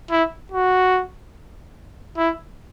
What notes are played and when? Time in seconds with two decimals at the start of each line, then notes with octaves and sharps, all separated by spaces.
0.11 E4
0.51 F#4
2.17 E4